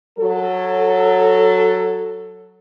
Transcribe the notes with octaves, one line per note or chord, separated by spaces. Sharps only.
F#3 A4